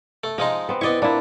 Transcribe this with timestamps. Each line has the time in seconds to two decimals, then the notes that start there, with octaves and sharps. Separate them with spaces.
0.24 A3
0.38 F3 G#3 D#4 D#5
0.69 B3 C4
0.81 B3 E4 D5 D#5 C#6
1.02 A#2 D4 E4